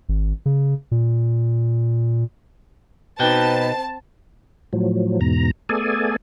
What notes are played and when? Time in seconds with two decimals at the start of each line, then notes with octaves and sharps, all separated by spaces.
0.09 G#1
0.46 C#3
0.91 A#2
3.19 B2 C4 D#4 F#4 B4 D#5 G5 A5
4.73 A2 F3 F#3
5.21 E2 G#2 B2 A#5
5.69 A3 B3 G#4 A4 D5 G#5